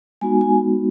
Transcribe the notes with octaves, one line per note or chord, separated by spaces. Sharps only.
G#3 B3 D#4 F#4 G#5
G#5